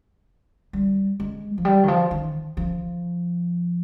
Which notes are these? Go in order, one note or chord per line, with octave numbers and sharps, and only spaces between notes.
G3
G#3
F3
G3
D#3
F3
D#3
F3